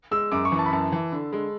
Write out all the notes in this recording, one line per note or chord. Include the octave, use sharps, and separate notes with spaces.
G#3 E6
F#2 D6
C#6
E3
A5
B5
F#2 A5
E3
D3
G#3